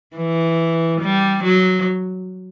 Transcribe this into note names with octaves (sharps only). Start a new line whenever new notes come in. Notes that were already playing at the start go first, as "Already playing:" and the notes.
E3
G3
F#3